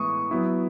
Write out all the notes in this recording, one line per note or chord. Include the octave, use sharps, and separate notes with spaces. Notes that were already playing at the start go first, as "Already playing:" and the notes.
Already playing: A2 E3 G#3 B3 C#6 D#6
F#3 B3 E4